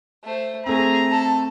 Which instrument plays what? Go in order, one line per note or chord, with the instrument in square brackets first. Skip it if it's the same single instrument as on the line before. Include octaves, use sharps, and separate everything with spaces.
[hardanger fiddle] A3 C5
[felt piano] A3 C4 [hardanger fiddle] G#4 [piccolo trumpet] A#5
[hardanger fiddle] A4 [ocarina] A5